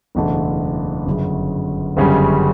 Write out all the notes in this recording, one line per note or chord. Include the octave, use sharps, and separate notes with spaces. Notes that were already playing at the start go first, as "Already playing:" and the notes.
F#1 E2 B2 A3 D4
G1 F#2 C#3
G1 F#2 C#3 G3 C#4